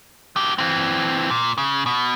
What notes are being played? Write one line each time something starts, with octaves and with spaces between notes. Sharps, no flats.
F#3 G4
E3 C4
A#2
C#3
B2